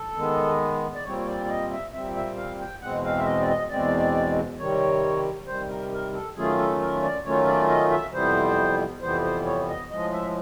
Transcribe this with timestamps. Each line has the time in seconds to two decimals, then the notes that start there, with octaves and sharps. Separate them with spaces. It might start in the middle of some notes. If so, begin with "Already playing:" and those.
Already playing: A4
0.16 D#3 G#3 B3
0.95 D5
1.04 A#2 G3 C4 C#5
1.18 C#5
1.26 D5
1.45 D5
1.49 D#5
1.72 E5
1.93 A#2 G3 C4 E5
2.16 E5
2.37 F5
2.60 G5
2.81 E2 B2 G#3 C4 F#5
3.04 F5
3.17 E5
3.25 D#5
3.41 D5
3.48 D#5
3.70 E2 B2 G#3 C4 D5
4.59 C3 D#3 G3 C#5
5.47 C3 D#3 G3 C5
5.69 A#4
5.92 A#4
6.13 A4
6.36 D#3 F#3 A3 C#4 F4 G#4
6.58 A4
6.80 A#4
7.03 D5
7.25 D#3 F#3 A3 C#4 F4 C#5
7.47 D5
7.69 D#5
7.91 E5
8.13 F2 C3 E3 G3 B3 C5
9.01 F2 C3 E3 G3 B3 C5
9.24 C5
9.46 C#5
9.69 D#5
9.90 A2 F3 G#3 D#5
10.12 E5